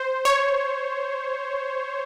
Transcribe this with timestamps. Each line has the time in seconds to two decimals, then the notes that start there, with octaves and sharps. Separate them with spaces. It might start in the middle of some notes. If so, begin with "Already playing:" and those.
Already playing: C5
0.25 C#5